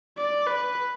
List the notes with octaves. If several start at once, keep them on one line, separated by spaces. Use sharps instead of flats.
D5
B4